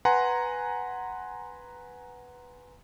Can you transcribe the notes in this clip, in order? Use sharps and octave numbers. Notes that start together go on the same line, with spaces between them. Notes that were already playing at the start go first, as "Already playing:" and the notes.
B4 F#5 G#5 A#5 C6